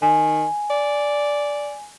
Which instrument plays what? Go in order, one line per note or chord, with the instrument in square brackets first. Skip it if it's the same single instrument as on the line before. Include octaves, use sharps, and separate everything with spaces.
[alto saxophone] D#3 [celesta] G#5
[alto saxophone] D5